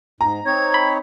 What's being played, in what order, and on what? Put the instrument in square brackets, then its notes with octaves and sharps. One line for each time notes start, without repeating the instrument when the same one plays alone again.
[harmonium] G#2 [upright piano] A#5
[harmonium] C4 D#4 C#5 [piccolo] G#6
[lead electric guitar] B5